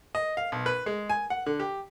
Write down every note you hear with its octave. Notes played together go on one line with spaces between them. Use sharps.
D#5
F5
B1
B4
G#3
G#5
F#5
D3
G4